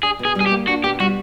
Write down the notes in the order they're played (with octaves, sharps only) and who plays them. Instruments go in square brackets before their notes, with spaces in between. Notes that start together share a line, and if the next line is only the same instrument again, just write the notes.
[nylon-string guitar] D4 [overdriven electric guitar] G#4
[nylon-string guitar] B2
[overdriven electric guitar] G#4
[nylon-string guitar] G3
[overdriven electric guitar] G#4
G4
[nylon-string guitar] A#3
[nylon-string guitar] D4 [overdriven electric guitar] F#4
[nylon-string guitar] B2 [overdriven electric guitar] G4
[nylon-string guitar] G3 [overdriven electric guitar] F#4